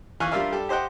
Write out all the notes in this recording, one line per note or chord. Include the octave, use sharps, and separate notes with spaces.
E3 F5 G#5 C#6 F#6
G3 D4 F4 A#4 E5 F5
G3 G4 A4
G4 C5 D#5 F#5 G5